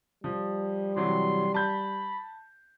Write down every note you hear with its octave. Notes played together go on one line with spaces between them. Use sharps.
F3 G3
C3 E3 F#3 C6
A5 B5 G6